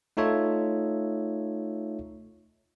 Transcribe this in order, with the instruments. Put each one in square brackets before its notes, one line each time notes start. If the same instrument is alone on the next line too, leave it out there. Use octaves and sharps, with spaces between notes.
[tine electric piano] A3 D#4 F4 A4 C#5 E5